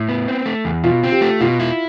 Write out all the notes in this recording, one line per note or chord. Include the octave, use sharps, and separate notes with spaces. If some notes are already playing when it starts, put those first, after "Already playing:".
Already playing: A2 E4
B3
C4
A3
E2
B2 F4
C4
G4
A3
B2 F4
E4